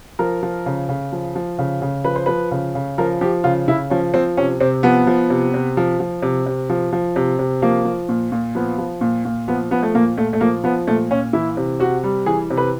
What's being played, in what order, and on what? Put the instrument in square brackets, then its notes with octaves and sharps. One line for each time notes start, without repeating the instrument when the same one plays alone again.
[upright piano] F3 A#4
F3
C#3
C#3
F3
F3
C#3
C#3
F3 B4
C5
F3 B4
C#3
C#3
F3 A#4
F3 G4
C#3 F4
C#3 E4
F3 C#4
F3 C4
C3 C#4
C3 C4
F3 B3
F3
C3
C3
F3
F3
C3
C3
F3
F3
C3
C3
F3 A#3
F3
A#2
A#2
F3 B3
F3
A#2
A#2
F3 B3
F3 B3
A3
A#2 A#3
A#2 A3
A3
F3 A#3
F3 B3
A#2 A3
A#2 C#4
E3 E4
C3
C3 F#4
G3
E3 G#4
C3
B4